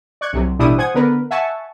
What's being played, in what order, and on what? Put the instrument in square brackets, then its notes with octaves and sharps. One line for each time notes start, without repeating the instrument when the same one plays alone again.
[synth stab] D5 C#6 F#6 G#6 C#7
C2 C3 F#3
A1 B2 G3 D4 E4 D#6
C5 F#5 G#5 D#6 G#6
D3 B3 A#4 B4
E5 F#5 G#5 A5 C#6